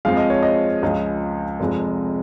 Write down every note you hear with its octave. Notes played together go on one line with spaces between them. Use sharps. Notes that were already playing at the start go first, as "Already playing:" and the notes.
F2 F3 G#3 F5
D#5
C#5
D#5
C#2 C#3 F3 G#3 D#5
F1 F2 F3 G#3